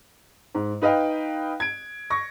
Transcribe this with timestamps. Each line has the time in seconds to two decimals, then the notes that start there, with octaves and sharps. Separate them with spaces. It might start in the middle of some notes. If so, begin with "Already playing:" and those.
0.55 G#2
0.82 D#4 B4 D#5 F5 G5
1.60 G#6 D7
2.10 C#6 A#6